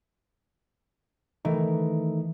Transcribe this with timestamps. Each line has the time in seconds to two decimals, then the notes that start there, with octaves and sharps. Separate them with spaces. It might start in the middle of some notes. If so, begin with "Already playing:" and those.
1.45 D#3 E3 A3 D#4